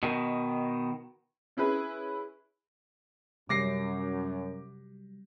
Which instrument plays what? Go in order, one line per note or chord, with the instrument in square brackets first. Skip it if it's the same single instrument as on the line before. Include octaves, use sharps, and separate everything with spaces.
[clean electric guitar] B2 D#3
[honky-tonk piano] C#4 E4 G#4 B4
[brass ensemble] F#2 [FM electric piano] C3 F#3 G3 [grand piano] D6 A#6 C7